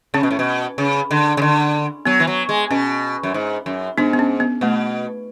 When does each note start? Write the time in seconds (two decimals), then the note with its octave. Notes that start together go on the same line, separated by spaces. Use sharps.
0.14 C#3 C#4
0.23 B2
0.31 A2
0.39 B2
0.78 C#3
1.11 D3
1.37 C#3
1.42 D3
2.06 F#3 B3
2.20 E3
2.27 F#3
2.49 G#3
2.71 B2 C#4
3.23 F#2
3.34 G#2
3.66 F#2
3.98 G#2 B3 D4
4.13 B3
4.19 C#4
4.40 B3
4.61 B2 A3